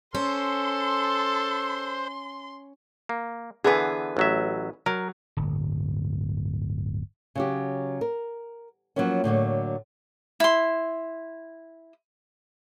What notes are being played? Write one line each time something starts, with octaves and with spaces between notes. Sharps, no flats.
C#4 A4 C5 C6
A#3
D3 E3 B3 G#4 B4
A1 F#3 E5
F#3 A#4
D1 G1
C#3 F#3 G4
A#4
F3 F#3 G#3 A#3 B3 C#4
A2 D3 F#3 A#3
E4 C6